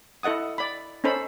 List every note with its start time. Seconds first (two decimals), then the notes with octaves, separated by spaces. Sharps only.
0.23 E4 A4 D#5 F#5 D#6
0.58 D5 B5
1.04 C#4 D#4 A4 C5 B5